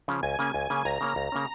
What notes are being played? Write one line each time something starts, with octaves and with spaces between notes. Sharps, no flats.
C#3 F3 C#4
C#2 G#5
C#3 A#3 C#4
C#2
C#3 A#3 C#4
C#2 A#5
C#3 A#3 C#4
C#2
C#3 A#3 C#4